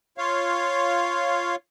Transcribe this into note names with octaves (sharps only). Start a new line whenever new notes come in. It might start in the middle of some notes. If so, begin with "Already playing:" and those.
F4 C#5 F5